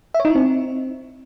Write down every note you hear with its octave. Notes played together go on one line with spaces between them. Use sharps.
E5
C#5
D#4
E4
C4